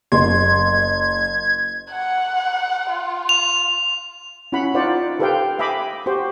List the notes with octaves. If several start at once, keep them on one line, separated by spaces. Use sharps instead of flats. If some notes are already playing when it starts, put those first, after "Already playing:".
F#1 D#5 C6 G#6
F#5
F4
F7
C#4 E4 F#4 F#5 B5
D#4 F4 C5 D5 F#5
G4 A4 B4 C5 F5 G5
D#5 E5 G5 G#5 B5 D6
F#4 G4 C5 G5